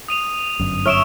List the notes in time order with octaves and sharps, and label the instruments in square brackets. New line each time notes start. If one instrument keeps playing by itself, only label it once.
[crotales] D#6 D#7 F7
[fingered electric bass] G1 F#2
[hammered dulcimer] C#5 E5 [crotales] F6 D7 E7